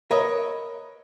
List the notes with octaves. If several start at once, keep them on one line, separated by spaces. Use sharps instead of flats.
A#4 B4 C#5 D#5 E5